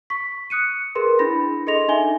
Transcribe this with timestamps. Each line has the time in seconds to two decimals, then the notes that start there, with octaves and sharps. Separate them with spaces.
0.10 C#6 B6
0.50 D#6 F#6 C#7 D#7
0.95 G#4 A#4 B4 C6
1.19 D4 E4 B5 A#6
1.67 G#4 A4 D#5 C6 A#6 F7
1.88 D4 D#4 E5 G#5 G7